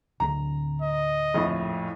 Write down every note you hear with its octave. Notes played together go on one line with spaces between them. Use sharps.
D1 D2 D3 A#5
D#5
A#1 F2 A2